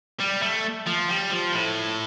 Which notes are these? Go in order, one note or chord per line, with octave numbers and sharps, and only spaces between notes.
G3
A3
F3
G3
F3
A2